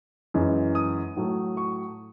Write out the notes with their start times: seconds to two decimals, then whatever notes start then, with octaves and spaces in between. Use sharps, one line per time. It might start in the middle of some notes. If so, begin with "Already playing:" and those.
0.34 F#2 E3 G#3
0.75 D#6
1.16 A2 F#3 A3
1.57 C#6